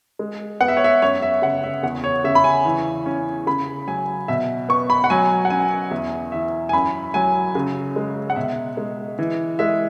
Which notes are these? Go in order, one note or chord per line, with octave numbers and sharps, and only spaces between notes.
G#3
B3 F#5
E5
C#5
E5
F#2 C#5
E5
C#3 F#5
E5
E2 F#5
C#5
C#3 E5
B5
G#5
E3
C#4
C#3 B5
F#3 G#5
B2 E5
B3 C#6
B5
F#5
F#3 G#5
F#5
C#4 G#5
E2 E5
E3 E5
G#5
F#2 B5
F#3 G#5
C#3
G#3
F#5
B2 E5
G#3
E3
G#3 E5